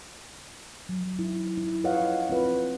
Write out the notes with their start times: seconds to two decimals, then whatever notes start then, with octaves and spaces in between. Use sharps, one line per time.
0.89 F#3
1.19 E4
1.58 E4
1.84 F4 B4 C#5 D#5 F5 F#5
2.29 C4 F4 B4